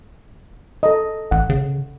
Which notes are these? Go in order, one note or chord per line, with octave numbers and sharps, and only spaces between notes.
A4 D#5
A1 F#5
C#3